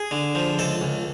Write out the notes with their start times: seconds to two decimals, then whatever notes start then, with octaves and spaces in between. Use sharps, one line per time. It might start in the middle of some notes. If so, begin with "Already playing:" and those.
Already playing: G#4
0.11 D3
0.35 F3
0.59 C#2 A4
0.81 C#2